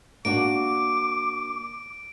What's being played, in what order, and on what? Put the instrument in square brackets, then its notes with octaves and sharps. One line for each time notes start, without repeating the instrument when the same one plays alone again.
[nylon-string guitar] A#3 D4 F#4 [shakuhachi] D6 [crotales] D7